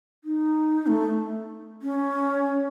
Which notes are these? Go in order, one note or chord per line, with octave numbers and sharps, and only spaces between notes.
D#4
A3
C#4